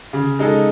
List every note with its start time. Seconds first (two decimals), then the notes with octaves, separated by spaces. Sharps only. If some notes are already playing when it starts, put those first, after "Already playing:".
0.13 C#3
0.39 G#3 D#4 A4